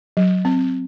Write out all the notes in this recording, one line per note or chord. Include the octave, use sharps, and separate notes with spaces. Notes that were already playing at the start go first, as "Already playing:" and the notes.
F#3
C4